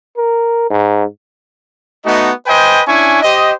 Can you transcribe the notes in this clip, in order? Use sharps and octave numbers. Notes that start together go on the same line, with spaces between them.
A#4
G#2
A3 B3 D#4 F#4 D#5
B4 C5 D#5 G5 G#5
C#4 D4 E4 G#5 C#6
G4 C5 D#5